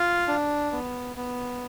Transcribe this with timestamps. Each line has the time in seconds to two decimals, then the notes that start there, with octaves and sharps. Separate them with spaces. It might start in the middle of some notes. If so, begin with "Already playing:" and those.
Already playing: F4 F5
0.28 D4
0.72 B3
1.16 B3